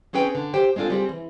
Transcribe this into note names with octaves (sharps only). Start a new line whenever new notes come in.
C4 C#4 G#4 B4 G5
D3
G4 C5 G5
G#3 C4 D4 F4 A4
G3 C4 G#4
E3